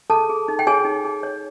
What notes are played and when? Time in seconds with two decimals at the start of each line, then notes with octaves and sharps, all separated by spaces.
0.10 G#4 A4 A5
0.29 G#4
0.48 D#4
0.59 G5
0.67 G#4 C#5 G#5
0.85 D#4
1.05 G#4
1.23 C#5